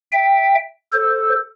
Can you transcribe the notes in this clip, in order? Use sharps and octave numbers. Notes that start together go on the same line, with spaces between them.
E5 G5
A4 C5